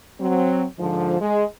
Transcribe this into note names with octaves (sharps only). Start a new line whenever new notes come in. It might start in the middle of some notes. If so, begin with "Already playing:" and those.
F#3 C4
G#2 D3 F3
G#3